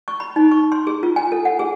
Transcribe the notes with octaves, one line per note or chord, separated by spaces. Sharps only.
C#6
B5
D#4
C#6
C6
G#4
F4
G#5
A4
F#5
G#4